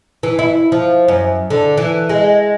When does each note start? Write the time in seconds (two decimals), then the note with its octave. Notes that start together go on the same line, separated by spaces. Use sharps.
0.23 E3
0.39 E4
0.72 F3
1.08 F#2
1.50 D3
1.77 E3
2.09 G#3